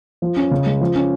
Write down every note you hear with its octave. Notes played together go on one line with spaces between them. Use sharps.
F3
C#4
C#3
G#3
F3
C#4